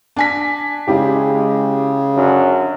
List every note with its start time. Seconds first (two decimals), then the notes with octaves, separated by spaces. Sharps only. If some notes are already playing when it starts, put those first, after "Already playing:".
0.17 D4 G#5 B6
0.88 C#3 G#3 E4 G4
2.14 F#2 D3 F#3